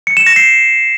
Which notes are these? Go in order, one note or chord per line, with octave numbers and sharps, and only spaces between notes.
C#7
E7
A#6
C7